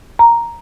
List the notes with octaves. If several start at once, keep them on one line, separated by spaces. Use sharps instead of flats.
A#5